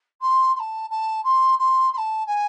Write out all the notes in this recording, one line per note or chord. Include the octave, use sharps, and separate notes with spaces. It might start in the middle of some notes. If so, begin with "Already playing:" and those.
C6
C6
A5
A5
C6
C6
C6
A5
G#5